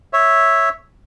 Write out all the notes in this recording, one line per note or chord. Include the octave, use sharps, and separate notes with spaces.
C#5 E5